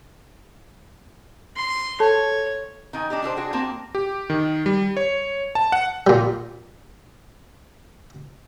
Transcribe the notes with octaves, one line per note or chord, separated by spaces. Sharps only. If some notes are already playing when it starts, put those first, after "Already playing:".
C6
A4 C#5 A5
D#3 D#4 G#5
D4 D#4 G4
D4 G4 A4 C5
D4 F#4 G#4
A#3 C4 A5
G4
D#3
G3
C#5
A5
F#5
A#2 G3